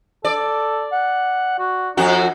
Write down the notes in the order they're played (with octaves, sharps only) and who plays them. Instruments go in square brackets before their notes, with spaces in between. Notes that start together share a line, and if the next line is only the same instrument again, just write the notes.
[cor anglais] A4 [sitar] D5
[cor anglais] F#5
F#4
[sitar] F2 F#4 [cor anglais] D#4